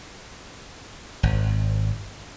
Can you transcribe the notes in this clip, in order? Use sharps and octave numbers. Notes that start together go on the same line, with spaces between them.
G#1